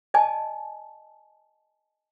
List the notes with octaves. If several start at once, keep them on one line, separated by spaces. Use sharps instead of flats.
D5 D#5 G#5 A5